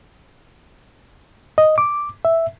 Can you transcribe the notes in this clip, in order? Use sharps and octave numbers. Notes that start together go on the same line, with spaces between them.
D#5
D6
E5